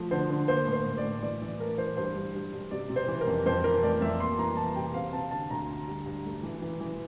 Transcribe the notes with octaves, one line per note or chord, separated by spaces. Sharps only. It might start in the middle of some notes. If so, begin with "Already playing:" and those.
Already playing: F3 A3
D3 C5
D3
A#3 C5
A2
C5
A2
D5
A2
E3 D5
E3
A3 A#4
E3 C5
G2 C5
G2
G2
G2
C3 D5
C3
C5
E3
A#4
F2
F2 C5
E3 A#4
A3 D5
F2 E5
A#3 C6
E3 A#5
E3 A5
C3 G5
C4 F5
C4 A5
D3 A5
D2 A#5
D3
G2
G2
A3
E3
E3
E3